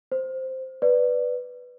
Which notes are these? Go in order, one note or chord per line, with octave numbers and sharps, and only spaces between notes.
C5
B4 D5